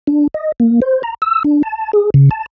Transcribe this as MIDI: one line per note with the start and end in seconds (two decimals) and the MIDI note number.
0.07 0.27 62
0.34 0.52 75
0.60 0.80 58
0.82 1.02 72
1.03 1.14 82
1.22 1.43 88
1.44 1.62 62
1.63 1.92 81
1.93 2.10 68
2.14 2.29 49
2.31 2.46 81